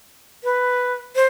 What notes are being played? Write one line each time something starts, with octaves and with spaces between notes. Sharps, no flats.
B4
C5